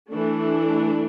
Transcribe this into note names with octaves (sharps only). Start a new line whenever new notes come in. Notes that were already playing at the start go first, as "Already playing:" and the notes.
E3 A3 D4